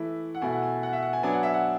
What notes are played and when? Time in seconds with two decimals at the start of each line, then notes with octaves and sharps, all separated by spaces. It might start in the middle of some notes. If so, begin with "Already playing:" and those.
Already playing: E3 A3 E4
0.35 F#5
0.42 B2 A3 E4 G#5
0.52 F#5
0.63 G#5
0.83 F#5
0.93 E5
1.03 F#5
1.13 G#5
1.23 F#3 B3 D4 G#5
1.33 F#5
1.43 E5
1.54 F#5